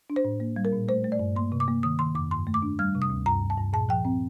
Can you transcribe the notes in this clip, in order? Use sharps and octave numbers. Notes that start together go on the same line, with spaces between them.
D4
C5
A2
A#3
G3
A#4
A#2
A3 C5
A3
D5
G2
A#3 C6
C3
D6
A#3
D#3 D#6
D#3 C6
F2 D6
G2 C6
A3
D6
D4
G3 F6
C3
D#6
D2
G2 A#5
G2
A5
G2
A#2 A5
F3 G5
C4